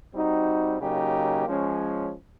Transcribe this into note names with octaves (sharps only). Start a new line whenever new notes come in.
G3 C4 D#4 F#4
C#3 F#3 A#3 D#4 G4
F3 G#3 C#4